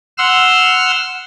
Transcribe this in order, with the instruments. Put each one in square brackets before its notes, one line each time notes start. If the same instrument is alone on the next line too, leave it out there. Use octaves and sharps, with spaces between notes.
[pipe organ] F#5 C6 E6 F6